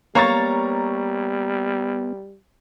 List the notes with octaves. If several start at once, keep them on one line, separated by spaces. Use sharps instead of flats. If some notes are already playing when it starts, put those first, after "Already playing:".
G3 A#3 B3 C#5 A#5 C#6 A6